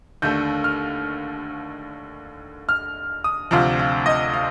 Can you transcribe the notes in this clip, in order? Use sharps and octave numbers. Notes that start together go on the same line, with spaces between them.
D#2 D3 A3 G6
F6
F6
D#6
D2 C3 F3 F5
F5
D#5
F5